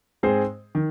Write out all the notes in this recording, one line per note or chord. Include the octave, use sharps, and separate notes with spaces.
G#2 G#3 C4 G#4 C5
D#3